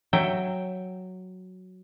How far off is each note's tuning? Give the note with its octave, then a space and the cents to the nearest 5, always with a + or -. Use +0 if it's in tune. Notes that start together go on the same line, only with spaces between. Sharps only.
F#3 +0 E5 +15 G5 +0